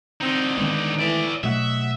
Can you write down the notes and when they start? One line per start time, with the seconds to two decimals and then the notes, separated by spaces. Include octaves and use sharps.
0.21 D3 C4 D#4
0.58 D#3 G#3 B3
0.99 A2 E3 D5 E5
1.43 B2 F#3 A3 F#4 D#5 E5 F#5